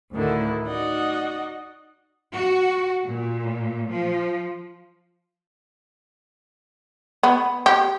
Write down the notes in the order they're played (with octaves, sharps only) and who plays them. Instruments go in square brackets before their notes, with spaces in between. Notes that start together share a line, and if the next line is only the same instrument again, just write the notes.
[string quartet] D2 A2 D3 D#3 E4
D#4 F#4 D5 D#5
[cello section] F#4
A#2
F3
[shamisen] B3
G4